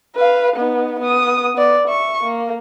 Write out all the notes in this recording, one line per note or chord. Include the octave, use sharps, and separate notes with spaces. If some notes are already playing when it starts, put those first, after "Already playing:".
B4 F5
B3 D#4
B3 D#6
B3 D5
E5 C#6
A#3